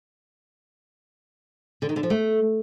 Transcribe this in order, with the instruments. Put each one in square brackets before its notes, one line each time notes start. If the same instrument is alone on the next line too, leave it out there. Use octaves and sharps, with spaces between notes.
[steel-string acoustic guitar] D3
D#3
D3
F3
A3